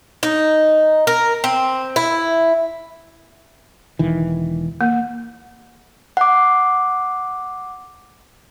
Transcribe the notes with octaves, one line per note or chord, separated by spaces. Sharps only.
D#4
A#4
C4
E4
E1 D#3 E3
A#3
F#5 D6